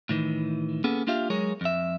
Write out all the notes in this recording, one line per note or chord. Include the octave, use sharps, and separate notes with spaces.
A2 D#3 E3
A#3 B3 C#4 G#4 A4
A#3 D4 F4 G4 E5 F5
F#3 G#3 G#4 A#4 C#5
F2 E5